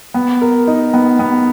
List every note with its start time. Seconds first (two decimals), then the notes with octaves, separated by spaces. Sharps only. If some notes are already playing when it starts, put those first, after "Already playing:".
0.14 B3
0.42 A#4
0.67 D#4
0.94 B3
1.19 B3